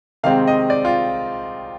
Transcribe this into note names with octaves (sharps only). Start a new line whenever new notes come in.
C3 D#3 G#3 C4 F5
D#5
D5
F4